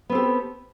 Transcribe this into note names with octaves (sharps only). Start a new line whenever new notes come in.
B3 C4 G4 A4